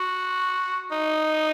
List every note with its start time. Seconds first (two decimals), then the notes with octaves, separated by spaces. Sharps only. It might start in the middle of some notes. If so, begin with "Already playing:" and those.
Already playing: F#4
0.91 D#4